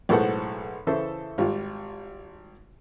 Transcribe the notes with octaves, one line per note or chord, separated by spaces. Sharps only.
B1 A2 G#3 A4 C5 F#5
C#3 E3 A4 C5 E5
G#1 G3 F4